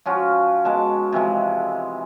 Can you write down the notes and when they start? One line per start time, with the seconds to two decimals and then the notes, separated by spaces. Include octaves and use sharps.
0.05 F3 C#4 F4 F#4
0.65 B2 G#3 A5
1.12 C3 E3 F3 G#3